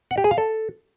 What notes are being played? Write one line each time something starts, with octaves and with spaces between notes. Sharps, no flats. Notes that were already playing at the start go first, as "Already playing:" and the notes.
F#5
G4
G#4
F5
A4